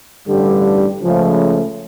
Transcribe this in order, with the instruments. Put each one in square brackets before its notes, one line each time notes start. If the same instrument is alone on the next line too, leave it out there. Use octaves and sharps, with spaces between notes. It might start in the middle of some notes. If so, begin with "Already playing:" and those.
[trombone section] A1 G2 D3 G3
C#2 C#3 F3 A3